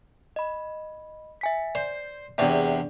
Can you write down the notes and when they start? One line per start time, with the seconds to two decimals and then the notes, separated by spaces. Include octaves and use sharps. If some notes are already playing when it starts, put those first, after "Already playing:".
0.36 D#5 B5
1.41 E5 G#5 B6
1.75 C5 D5
2.38 E2 C3 D4 G#4 D5